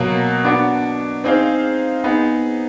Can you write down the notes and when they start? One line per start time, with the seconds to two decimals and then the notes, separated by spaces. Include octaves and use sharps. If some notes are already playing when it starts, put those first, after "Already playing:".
Already playing: B2 F#3 A#3
0.45 B3 D4 F#4
1.24 C4 D#4 G#4 C5 F5
2.04 B3 D#4 G#4